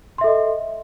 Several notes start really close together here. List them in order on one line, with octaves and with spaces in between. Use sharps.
C6 E5 A4 D#5